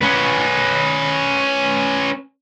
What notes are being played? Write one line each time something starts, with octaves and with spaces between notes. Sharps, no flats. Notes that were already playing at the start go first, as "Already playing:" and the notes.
C#4 B4